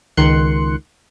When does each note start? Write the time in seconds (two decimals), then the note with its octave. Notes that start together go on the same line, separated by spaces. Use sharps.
0.17 C#2 D#3 C6 F#6 C#7